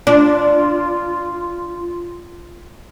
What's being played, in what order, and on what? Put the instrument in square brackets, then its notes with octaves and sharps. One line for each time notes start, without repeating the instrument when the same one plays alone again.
[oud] D4 [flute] F4